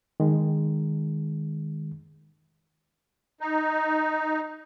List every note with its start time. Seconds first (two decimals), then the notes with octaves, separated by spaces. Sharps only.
0.20 D#3 G#3
3.41 D#4